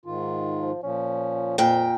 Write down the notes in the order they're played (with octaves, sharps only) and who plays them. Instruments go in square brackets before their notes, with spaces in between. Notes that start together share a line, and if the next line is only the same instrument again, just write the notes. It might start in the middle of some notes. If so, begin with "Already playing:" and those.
[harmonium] G#2 D#3 F4
[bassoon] F3
[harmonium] A#2 F3 [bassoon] C#4
[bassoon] F2 [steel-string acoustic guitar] A#2 G5